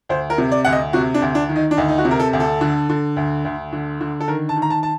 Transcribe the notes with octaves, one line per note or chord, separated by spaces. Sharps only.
D2 C5
A#4
C3
D5
D2 F#5
D#5
C3 F#4
D4
D2
D4
D#3
D#4
D4
D2 D#4
D#4
F#4
C3
A#4
A4
D2
A4
D3
D3
D2
D2
D3
D3
A4
D#3 A#4
A5
D#3
A#5
A5
A5